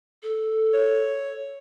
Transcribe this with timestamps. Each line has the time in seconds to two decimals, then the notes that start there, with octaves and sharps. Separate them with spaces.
0.23 A4
0.73 C#5